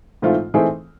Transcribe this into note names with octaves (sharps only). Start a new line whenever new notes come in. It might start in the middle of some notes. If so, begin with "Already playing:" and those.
G#2 E3 A3 C4 F4
E3 A3 C4 D#4 G#4